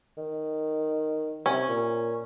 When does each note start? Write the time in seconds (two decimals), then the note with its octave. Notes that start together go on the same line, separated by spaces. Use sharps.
0.17 D#3
1.46 C3 C#4
1.68 A#2